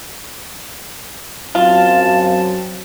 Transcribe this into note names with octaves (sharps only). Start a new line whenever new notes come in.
F#2 F#3 C4 F4 A5